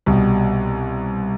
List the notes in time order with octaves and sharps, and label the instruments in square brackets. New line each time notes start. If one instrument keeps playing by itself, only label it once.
[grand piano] C2 B2 G3